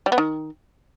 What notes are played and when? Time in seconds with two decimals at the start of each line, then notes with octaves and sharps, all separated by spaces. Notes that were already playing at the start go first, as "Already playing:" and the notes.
0.06 G3
0.12 B3
0.18 D#3